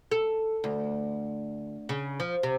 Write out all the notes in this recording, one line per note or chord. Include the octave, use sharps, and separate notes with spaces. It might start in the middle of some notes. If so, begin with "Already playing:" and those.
A4
D2
C#3
F3
C3